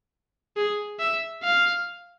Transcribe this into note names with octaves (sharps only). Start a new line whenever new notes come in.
G#4
E5
F5